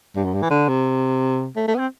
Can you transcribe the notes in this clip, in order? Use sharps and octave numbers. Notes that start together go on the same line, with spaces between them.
G2
F#2
G2
E3
D3
C3
A3
A3
B3
C4